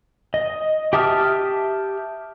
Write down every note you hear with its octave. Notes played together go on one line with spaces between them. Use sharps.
D#5
G4 E5 A5 D#6 F6